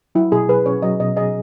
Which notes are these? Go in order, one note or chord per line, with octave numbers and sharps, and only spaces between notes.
F#3 E4
B2 G#4
G#4 B4
C#4 C#5
F#3 D#5
B2 D#5
G#4 D#5